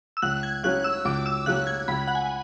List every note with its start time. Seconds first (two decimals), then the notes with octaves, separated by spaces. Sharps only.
0.17 E6
0.22 C#2 F#6
0.43 G#6
0.63 C#3 F#3 C#4 F#6
0.84 E6
1.05 C#2 D6
1.26 E6
1.46 C#3 F#3 C#4 F#6
1.67 G#6
1.88 C#2 B5
2.08 F#5
2.15 G#5